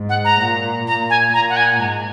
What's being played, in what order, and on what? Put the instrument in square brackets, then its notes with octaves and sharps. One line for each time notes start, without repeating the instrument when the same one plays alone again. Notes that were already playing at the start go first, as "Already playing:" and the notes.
Already playing: [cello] G#2
[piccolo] F#5
A#5
[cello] A#2
[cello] A#2 [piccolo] A#5
[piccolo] G#5
[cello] A#2 [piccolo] A#5
[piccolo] F#5
G#5
[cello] G#2 [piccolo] A#5